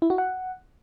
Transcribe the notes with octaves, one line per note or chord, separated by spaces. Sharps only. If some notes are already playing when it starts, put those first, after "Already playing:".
E4
F#4
F#5